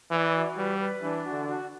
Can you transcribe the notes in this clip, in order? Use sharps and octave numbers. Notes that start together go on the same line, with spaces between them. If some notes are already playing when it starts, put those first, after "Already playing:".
E3 D5
F#4
G3 B4
B4
E3 D4
F#4
D3
F#4